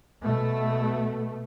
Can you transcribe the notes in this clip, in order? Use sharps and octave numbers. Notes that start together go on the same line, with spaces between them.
B2 A3